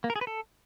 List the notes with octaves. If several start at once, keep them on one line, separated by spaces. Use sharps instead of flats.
A#3
A#4
G#4
B4
A4